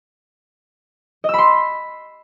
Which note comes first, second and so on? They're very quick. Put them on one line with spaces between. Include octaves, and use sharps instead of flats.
D#5 E6 B5 C6